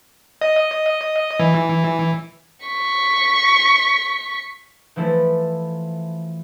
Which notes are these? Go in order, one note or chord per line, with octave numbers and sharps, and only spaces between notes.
D#5
E3
C#6 B6
E3 F3 A3 E4 A4